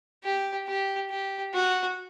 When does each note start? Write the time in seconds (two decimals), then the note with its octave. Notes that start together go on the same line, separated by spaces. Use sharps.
0.24 G4
0.67 G4
1.10 G4
1.53 F#4